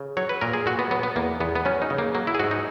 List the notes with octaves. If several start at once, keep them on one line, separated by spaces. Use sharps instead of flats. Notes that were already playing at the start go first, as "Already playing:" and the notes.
Already playing: C#3
F#3 C#5
B4
A#2 A#4
G#4
A#2 F#4
B3
F#3 B3
B3
E2 A#3
E2 B3
B3
F#3 C#4
D#4
C#3
A#3
F#3 A#3
E4
G#4
G#2 F#4
D#4